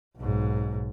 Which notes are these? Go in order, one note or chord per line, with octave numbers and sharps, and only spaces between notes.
B1 G#2